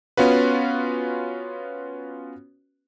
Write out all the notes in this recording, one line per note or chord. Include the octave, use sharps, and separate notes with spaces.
B3 C#4 F4 F#4 B4